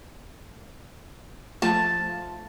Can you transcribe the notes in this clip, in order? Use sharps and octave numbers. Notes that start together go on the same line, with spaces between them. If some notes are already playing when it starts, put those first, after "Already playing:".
F3 A3 F4 A5